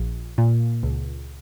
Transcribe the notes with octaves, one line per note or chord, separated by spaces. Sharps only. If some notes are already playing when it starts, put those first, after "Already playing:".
Already playing: A#1
A#2
C#2